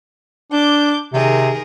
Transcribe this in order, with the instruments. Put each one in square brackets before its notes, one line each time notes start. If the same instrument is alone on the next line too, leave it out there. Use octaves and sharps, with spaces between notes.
[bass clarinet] D4 [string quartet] D6 G6
[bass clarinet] C3 [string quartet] D#3 G#4 A#4